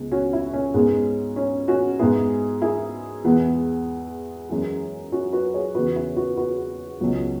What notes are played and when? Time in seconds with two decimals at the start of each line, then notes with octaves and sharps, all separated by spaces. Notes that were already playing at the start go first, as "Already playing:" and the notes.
Already playing: C#2 C#3 G#3 B3
0.12 C#4 F#4
0.33 E4
0.53 C#4
0.74 G#2 G#3 B3
1.36 C#4
1.68 C#4 F#4
1.99 G#2 G#3 B3 E4 G#4
2.62 E4 G#4
3.24 E2 E3 G#3 B3
4.49 F#2 E3 G#3
5.12 C#4 F#4
5.33 F#4 B4
5.54 G#4 C#5
5.75 E2 C#3 E3 B3 F#4 B4
5.95 E4 G#4
6.17 F#4 B4
6.37 F#4 B4
6.99 C#2 C#3 F#3 B3